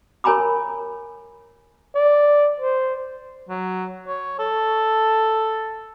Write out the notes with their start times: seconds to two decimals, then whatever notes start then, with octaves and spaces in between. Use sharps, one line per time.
0.24 A#4 C#5 G#5 A#5 B5 D6
1.95 D5
2.60 C5
3.49 F#3
4.07 C#5
4.39 A4